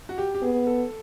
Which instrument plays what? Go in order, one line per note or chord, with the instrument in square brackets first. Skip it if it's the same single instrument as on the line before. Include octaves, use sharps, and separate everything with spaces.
[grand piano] F#4
G4
G4
[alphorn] B3 [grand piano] G#4
[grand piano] A4